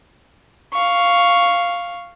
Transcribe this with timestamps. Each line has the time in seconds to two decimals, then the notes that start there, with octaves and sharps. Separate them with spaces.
0.73 F5 C#6